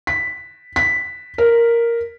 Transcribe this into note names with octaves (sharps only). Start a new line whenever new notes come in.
B6
B6
A#4